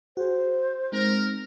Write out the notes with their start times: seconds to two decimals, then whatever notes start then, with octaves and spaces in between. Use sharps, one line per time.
0.17 F#4 G#4 C5
0.92 G#3 C4 D#4 A#4